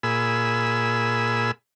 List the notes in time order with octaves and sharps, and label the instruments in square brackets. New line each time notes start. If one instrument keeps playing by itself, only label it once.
[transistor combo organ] A#2 G#4 B5 E6